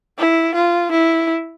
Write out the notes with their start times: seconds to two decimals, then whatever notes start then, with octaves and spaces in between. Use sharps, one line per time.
0.18 E4
0.55 F4
0.91 E4